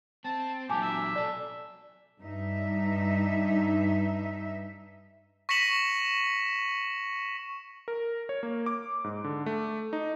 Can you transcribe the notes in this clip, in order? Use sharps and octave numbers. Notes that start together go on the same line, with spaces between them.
C4 A5
A#2 F#3 G4 G#5 A5 D6
E5
B1 A4 D5
G2 D#4 E5
C#6 A#6 B6 C#7 E7 F#7
A#4
C#5
A#3
D6
G#2
D3
A3
D#4